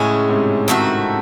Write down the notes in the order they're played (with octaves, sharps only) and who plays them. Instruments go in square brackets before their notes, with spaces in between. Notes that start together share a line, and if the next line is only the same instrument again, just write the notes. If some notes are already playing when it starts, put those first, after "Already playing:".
Already playing: [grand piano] A2 C#3 [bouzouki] G#3 C#4 G#4
[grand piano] G#2 C3
[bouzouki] D#3 A3 C4 F#4